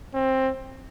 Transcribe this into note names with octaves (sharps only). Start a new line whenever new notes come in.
C4